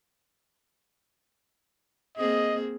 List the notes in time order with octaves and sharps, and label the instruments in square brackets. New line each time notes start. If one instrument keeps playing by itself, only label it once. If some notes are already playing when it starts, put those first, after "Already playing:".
[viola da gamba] A#3 C4 G#4 [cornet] D#5